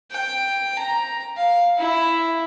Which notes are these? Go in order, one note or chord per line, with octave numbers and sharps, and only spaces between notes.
G5
A#5
F5
E4